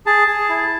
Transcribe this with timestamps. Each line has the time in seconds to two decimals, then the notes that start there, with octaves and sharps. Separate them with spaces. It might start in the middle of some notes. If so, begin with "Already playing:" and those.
0.06 G#4 A5
0.28 G#4
0.49 E4